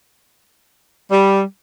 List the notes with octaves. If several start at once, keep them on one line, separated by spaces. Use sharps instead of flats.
G3